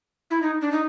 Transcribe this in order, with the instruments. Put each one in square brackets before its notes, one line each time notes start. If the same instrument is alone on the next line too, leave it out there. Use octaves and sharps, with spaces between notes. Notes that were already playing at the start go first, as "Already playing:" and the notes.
[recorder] E4
D#4
D4
D#4